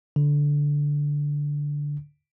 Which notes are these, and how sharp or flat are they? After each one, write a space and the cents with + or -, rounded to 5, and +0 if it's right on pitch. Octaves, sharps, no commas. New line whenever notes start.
D3 -10